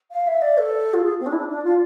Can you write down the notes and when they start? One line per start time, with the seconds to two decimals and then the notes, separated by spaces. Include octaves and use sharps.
0.11 F5
0.27 E5
0.41 D5
0.57 A4
0.93 F4
1.03 G#4
1.20 C4
1.26 D4
1.32 E4
1.38 D4
1.48 D4
1.64 F4